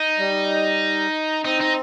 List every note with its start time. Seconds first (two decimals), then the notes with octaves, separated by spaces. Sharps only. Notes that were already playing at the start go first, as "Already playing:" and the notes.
Already playing: D#4
0.19 G3
1.45 C4 D#4
1.61 D#4